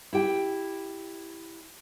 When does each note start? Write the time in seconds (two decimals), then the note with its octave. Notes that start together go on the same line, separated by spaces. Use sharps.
0.13 E4 G4 G5